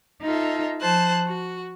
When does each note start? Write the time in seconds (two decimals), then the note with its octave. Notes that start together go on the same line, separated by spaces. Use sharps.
0.23 D#4 F4 A4 E5
0.80 F3 C5 A5 F#6
1.26 F#4